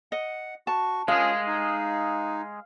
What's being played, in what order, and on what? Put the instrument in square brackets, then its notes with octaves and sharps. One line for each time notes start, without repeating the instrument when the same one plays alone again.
[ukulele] D#5 [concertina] F#5
[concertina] F#4 C#6 [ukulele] A5
[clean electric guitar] G#3 G#4 [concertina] C#4 F4 [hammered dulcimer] F5
[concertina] D#4